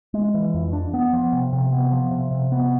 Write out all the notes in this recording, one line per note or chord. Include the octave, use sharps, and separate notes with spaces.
G#3
E3
F2
D4
B3
F3
C3
C3
B3
F3
C3
C3
B3